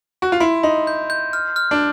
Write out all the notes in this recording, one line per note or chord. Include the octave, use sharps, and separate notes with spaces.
F#4
F4
E4 C6
D#4 C6
G6
G6
F6
F6
D4